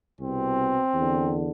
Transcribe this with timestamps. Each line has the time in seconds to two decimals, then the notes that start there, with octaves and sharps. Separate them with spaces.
0.20 C2 B2 C4
0.95 E2 D3